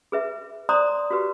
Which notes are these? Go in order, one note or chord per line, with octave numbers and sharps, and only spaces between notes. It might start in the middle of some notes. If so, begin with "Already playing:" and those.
G#4 B4 E5
C5 D5 A#5 C6 D#6
F#4 G4 B4